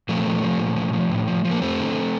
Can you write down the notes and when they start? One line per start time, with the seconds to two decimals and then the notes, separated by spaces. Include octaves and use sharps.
0.09 A#2 F3 A3
0.26 F3
0.43 F3
0.59 A#2
0.76 F3
0.93 F3
1.11 A2
1.27 F3
1.45 F3
1.51 A#3
1.61 F2 A3 C4
1.79 D3